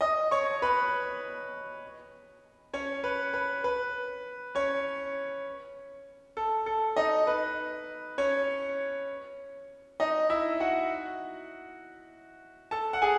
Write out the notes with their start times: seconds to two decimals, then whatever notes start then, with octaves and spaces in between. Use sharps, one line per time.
0.01 D#5 D#6
0.31 C#5 C#6
0.62 B4 B5
2.73 C#4 C#5
3.04 B4
3.34 B4
3.64 B4
4.55 C#4 C#5
6.37 A4
6.66 A4
6.96 D#4 D#5
7.27 B4
8.18 C#4 C#5
10.00 D#4 D#5
10.30 E4 E5
10.60 F#4 F#5
12.71 A4 A5
12.93 F#5
13.02 G#4 G#5